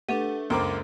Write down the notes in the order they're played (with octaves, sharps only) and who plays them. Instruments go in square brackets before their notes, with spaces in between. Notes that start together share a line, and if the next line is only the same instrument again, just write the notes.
[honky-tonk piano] A3 [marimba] D4 A4 B4 [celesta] G4 F#5 D#7
[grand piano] C#2 A#3 D6 [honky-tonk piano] F#2 [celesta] C5 A#5 C6